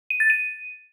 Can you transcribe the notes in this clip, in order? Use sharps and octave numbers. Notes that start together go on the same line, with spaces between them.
D#7
A6
D#7